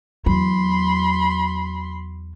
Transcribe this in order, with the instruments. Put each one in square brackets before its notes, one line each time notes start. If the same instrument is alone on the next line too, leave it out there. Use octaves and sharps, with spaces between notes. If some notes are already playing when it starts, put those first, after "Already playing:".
[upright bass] E2 F#3 [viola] B5 C6